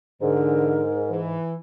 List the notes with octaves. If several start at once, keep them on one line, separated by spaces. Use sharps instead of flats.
G#2 D3 E3 A#4
E3